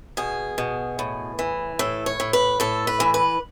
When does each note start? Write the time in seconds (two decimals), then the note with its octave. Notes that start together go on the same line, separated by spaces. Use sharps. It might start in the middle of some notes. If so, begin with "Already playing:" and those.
0.17 B2 G#4
0.58 B2
0.99 A2
1.39 E3
1.79 A2 A4
2.06 C#5
2.20 A2
2.33 B4
2.60 A2 A4
2.87 B4
3.00 E3
3.14 B4